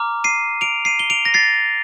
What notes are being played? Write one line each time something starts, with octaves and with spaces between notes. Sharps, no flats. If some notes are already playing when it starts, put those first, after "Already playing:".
Already playing: A#5 D6 F6
C7 D#7
D7 F7
C7 D#7
G7
D7 F7
A#6
A6 C7